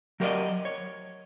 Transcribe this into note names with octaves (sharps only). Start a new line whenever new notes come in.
F#3 G4 A#4 B4 D5 D#5
C#5